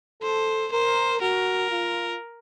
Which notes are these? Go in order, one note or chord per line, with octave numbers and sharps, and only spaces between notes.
A4 C5
A#4 C5
F#4 A#4
F4